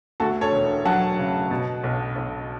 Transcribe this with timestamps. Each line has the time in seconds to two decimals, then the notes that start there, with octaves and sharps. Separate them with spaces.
0.20 D2 F#4 A4
0.41 A4 C#5
0.52 E1
0.85 F#3 F#5 A5
1.18 C#3
1.51 B2
1.84 B1
2.16 B1